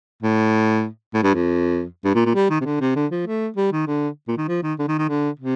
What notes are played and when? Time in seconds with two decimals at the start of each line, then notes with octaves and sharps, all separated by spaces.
0.23 A2
1.14 A2
1.23 G2
1.34 F2
2.05 G2
2.15 A#2
2.26 A#2
2.35 G3
2.50 D#3
2.61 C3
2.65 D3
2.81 C3
2.96 D3
3.12 F3
3.27 A3
3.57 G3
3.72 D#3
3.87 D3
4.28 A#2
4.38 D#3
4.48 F3
4.63 D#3
4.79 D3
4.88 D#3
4.98 D#3
5.09 D3
5.39 C3